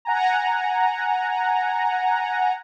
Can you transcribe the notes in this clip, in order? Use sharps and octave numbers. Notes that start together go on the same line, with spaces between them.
F#5 G#5 A#5